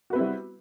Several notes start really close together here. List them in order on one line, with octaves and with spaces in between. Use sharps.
F#4 B4 C4 E4 G3